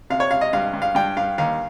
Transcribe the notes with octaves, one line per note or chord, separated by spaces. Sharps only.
C3 F5
C#5
C3 F5
D#5
G2 F5
G2
F5
G2 G5
G2 F5
D#2 F5